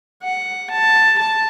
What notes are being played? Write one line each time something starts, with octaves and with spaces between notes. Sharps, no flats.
F#5
A5
A5